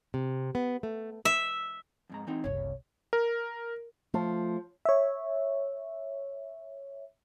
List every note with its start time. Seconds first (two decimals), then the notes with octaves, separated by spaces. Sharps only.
0.14 C3
0.55 B3
0.83 A3
1.25 E5
2.10 F2 G#2 A#5
2.27 E3 C4 D#4
2.44 F#1 C2 C#5
3.13 A#4
4.14 F3 A3
4.85 C#5 E5